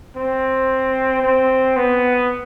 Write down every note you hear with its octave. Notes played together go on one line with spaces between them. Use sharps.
C4
C4
B3